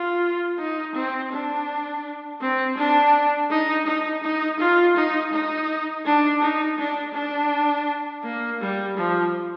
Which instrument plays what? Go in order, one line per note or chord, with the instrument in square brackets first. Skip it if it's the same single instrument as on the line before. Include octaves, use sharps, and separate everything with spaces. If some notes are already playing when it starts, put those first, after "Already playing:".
Already playing: [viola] F4
D#4
C4
D4
C4
D4
D#4
D#4
D#4
F4
D#4
D#4
D4
D#4
D4
D4
A#3
G3
F3